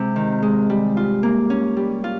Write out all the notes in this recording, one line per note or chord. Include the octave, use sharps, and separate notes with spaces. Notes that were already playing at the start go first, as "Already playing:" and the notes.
Already playing: C3 G#3
D#3
G#3
G3
F4
A#3
C#4
G3
F4